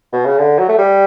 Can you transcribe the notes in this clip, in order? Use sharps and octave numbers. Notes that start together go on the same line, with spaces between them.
B2
C#3
D3
F#3
A3
G3